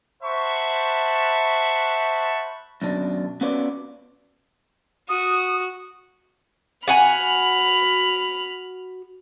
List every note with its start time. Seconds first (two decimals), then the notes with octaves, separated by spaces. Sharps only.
0.23 C5 E5 F#5 A5 B5 C#6
2.82 F#2 B2 D4
3.41 B3 C#4 F4 F#4 B4 D5
5.09 F#4 D#6
6.88 F#4 F#5 G#5 B5 F6